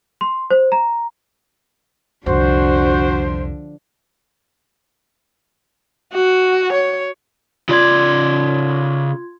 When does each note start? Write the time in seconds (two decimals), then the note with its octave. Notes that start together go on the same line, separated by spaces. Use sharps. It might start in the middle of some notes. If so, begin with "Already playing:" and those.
0.21 C6
0.51 C5
0.72 A#5
2.26 C2 F2 D3 F3 D4 F#4 C5
6.14 F#4
6.73 C#5
7.69 C#3 F4 D5 C6 G#6